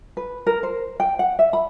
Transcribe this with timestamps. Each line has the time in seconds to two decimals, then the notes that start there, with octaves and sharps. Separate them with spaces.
0.17 B4
0.47 A#4
0.63 C5
1.00 G5
1.19 F#5
1.39 E5
1.53 B5